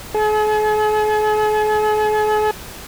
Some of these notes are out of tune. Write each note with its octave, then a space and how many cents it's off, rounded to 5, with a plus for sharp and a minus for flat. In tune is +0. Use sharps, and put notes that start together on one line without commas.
G#4 +45